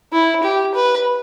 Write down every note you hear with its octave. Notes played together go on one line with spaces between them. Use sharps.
E4
G4
B4